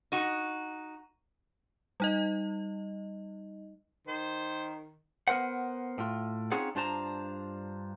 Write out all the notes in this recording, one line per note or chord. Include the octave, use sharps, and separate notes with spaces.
D#4 F#4
G3 D#4 D#5
D#3 C5
B3 A#4 C5 F#5
A2 F4
C4 C#4 D#4 F4 G#4 F#5
G2 D4 F4 C5 A5 A#5